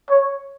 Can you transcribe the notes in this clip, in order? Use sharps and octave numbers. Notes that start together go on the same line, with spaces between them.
C#5